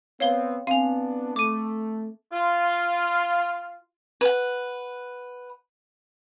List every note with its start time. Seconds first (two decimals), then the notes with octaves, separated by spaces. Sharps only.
0.20 B3 C4 C#5 F5 G7
0.67 B3 C4 D4 F5 G#5 F7
1.36 A3 D6 D#7
2.33 F4
4.21 B4 F#5